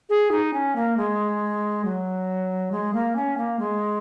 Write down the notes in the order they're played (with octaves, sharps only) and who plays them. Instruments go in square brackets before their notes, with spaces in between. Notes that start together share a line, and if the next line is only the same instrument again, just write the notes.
[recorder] G#4
D#4
C#4
A#3
G#3
F#3
G#3
A#3
C#4
A#3
G#3